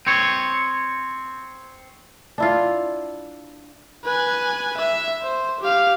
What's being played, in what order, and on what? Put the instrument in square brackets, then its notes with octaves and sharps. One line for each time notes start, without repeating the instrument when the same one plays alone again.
[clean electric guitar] C4 C#5
[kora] D4 E4 F4
[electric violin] B4 G#5
E5
C5
G4 F5